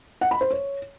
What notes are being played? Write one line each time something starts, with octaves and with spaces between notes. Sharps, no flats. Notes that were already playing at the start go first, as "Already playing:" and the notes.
F#5
B5
C5
C#5